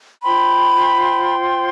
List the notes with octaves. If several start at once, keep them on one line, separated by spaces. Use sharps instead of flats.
F4 C5 G5 B5 C6